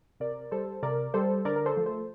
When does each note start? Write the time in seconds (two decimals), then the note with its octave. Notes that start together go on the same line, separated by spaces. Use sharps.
0.20 C3 A#4 D5
0.51 G3 A4 C5
0.83 C3 A#4 D5
1.14 G3 A4 C5
1.45 D3 A#4 D5
1.56 A#4
1.66 A4 C5
1.76 F3 A3
1.86 A4 C5